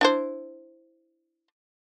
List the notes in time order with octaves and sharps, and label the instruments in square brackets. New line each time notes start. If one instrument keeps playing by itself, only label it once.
[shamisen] D4 E4 C5